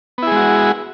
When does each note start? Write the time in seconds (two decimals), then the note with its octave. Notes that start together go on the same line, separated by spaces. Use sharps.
0.18 B3
0.23 E4
0.27 G#4
0.32 G#3
0.36 F#4